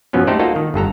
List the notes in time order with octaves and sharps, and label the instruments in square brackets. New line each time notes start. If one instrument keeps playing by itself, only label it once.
[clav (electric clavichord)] F#2 B2 F3 F#3 B3 C#4
A3 D#4 G4 A4 C5 D5
A#3 D#4 F4 F#4 A4
D#3
G1 G2 A4 A#5